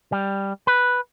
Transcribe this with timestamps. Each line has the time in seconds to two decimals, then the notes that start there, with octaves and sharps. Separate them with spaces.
0.12 G3
0.67 B4